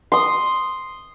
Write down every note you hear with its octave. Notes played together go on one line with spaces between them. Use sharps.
C6 D#6